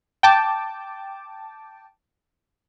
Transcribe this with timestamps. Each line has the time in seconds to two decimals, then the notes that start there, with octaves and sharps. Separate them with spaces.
0.23 G5 A5 D6